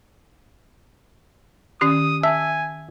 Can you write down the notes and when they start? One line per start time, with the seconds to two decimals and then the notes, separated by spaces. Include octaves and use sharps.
1.81 D#3 C#4 G4 D#6
2.23 E5 G#5 A5